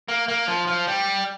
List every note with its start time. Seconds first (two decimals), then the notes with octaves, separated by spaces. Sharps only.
0.08 A#3
0.28 A#3
0.48 F3
0.67 F3
0.87 G3